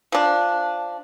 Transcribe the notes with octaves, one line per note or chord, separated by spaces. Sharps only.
F3 D4